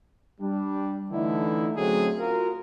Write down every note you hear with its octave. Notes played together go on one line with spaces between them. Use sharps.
G3 D4
D3 E3 A3 D#4 E4
D3 F#3 A3 C4 C#4 G#4
F4 F#4 A#4